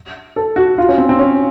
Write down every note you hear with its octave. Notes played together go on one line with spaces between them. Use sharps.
A4
F#4
F4
C#4
C4
C4
C#4